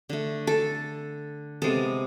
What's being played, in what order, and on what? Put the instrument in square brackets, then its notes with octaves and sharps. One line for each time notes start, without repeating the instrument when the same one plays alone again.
[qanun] D3 A3
A4
C3 G#3 B3 A4